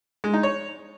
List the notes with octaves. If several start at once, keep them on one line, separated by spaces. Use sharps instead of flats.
G#3
D#4
C#5